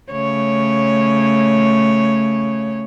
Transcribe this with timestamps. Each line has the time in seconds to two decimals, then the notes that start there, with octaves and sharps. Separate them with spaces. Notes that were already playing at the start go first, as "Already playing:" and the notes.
0.12 C#3 A3 C#5